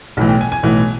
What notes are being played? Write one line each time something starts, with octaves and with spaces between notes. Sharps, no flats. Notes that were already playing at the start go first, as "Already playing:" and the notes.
B1 A2 E3
G5
G#5
G#5
B1 A2 E3